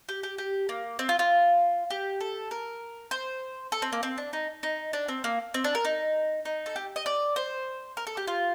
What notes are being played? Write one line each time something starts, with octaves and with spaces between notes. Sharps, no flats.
G4
G4
G4
A#3
C4
F4
F4
G4
A4
A#4
C5
A4
C4
A#3
C4
D4
D#4
D#4
D4
C4
A#3
C4
D4
A#4
D#4
D#4
A4
G4
D#5
D5
C5
A#4
A4
G4
F4